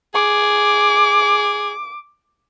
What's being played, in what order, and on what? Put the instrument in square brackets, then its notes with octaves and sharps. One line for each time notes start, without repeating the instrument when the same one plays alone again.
[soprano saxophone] G#4 [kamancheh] D6